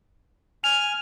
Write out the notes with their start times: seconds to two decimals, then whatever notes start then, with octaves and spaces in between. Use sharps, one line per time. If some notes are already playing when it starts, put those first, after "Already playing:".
0.64 G#5 F6 F7